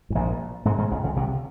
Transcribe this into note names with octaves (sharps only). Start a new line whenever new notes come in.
G#2
A#1 A#2
G#2 G#3
G#2 G#3
C#2 C#3
C#2 C#3
C2 C3